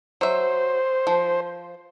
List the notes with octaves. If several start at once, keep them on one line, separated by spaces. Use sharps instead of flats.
F#3 C5 E5
F3